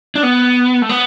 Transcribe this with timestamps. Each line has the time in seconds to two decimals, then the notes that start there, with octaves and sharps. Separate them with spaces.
0.16 D4
0.23 B3
0.82 A3
0.89 B3